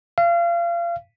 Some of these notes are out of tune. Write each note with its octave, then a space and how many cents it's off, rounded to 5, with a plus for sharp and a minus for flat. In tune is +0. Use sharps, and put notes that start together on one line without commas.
F5 -30